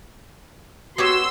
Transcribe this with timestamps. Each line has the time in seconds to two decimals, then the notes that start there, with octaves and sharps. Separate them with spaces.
0.98 B3 F#4 G4 C#5 C6 E6